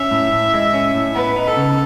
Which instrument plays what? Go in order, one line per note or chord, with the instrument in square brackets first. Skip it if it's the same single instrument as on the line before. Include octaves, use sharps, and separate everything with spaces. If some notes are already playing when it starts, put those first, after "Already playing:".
Already playing: [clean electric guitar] C#4 [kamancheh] E5
[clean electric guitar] A2
A2
G#3
C#4
A2
[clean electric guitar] B3 [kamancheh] B4
[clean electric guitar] D#4
[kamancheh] A4
[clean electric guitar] C#3